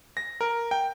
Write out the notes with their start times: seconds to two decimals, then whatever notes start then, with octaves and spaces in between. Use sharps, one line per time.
0.17 A#6
0.41 A#4
0.71 G5